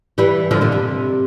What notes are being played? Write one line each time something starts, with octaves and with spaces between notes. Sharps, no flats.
E3 G3
D3 F3
A#2 D3
C3